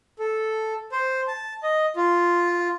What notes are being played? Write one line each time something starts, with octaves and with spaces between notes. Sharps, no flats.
A4
C5
A5
D#5
F4